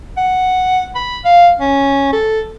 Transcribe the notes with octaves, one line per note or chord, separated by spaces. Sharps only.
F#5
B5
F5
C#4
A4